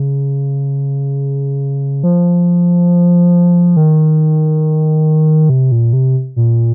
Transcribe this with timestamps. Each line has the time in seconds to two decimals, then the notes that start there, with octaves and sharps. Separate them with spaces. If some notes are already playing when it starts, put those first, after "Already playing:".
Already playing: C#3
2.03 F3
3.77 D#3
5.49 C3
5.72 A#2
5.93 C3
6.36 A#2